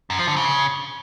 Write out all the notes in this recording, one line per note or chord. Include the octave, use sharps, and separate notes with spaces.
F#2
F3
D3
C#3